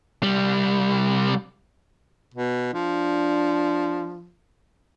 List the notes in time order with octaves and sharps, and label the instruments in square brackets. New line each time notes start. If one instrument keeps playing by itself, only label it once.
[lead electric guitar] C2 G3
[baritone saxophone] B2
[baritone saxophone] F3 [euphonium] D4